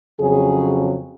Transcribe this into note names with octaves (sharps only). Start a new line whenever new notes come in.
F2 C#3 F#3 G#4